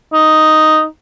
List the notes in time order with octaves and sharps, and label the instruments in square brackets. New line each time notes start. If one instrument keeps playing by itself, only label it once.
[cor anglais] D#4